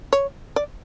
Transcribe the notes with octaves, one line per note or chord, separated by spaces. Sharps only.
C#5
D5